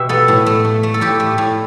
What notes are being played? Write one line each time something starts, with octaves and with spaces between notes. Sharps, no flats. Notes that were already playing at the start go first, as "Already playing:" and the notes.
Already playing: B2 G4 E5 G5
B3 A4
A2
A3
A3
A3
A4
A2 G4
A3
A2